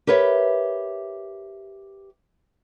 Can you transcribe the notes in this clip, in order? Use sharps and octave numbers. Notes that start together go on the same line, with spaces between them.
G4 A#4 B4 C#5 E5